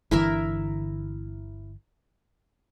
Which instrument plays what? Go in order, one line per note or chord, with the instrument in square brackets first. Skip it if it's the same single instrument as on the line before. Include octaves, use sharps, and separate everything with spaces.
[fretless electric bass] G1 D3 E3 [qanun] E4 A#4 E5